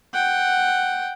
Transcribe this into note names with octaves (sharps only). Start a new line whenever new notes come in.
F#5 G5